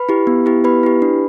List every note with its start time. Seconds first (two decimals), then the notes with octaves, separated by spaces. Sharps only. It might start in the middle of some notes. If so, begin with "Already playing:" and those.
Already playing: B4 B5
0.09 E4 G4
0.27 B3
0.46 E4 G4
0.64 B3 B4 B5
0.83 E4 G4
1.02 D4